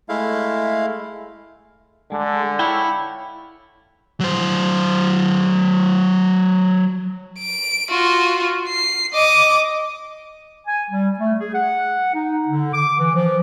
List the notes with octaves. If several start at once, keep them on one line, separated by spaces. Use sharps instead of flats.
G#3 A3 E4 F5
D3 G#3
E4 C#5 F5 G5
F#3 C5
D7
F4 F#4
C7
D#5 D6
G#5
G3
A3
G#4
F#5
D#4
D3
D6
E3
F3